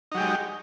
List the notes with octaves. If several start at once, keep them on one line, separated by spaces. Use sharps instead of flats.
F#3 G#3 D#4 G4